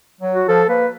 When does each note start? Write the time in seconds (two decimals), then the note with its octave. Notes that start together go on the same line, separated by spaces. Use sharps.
0.21 F#3
0.34 F#4
0.48 F3 A4
0.69 A#3 B4